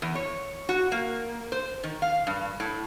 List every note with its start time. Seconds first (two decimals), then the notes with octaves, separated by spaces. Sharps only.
0.02 E2
0.15 C#5
0.69 F#4
0.92 A#3
1.52 C5
1.83 D#3
2.02 F5
2.27 G2
2.60 A2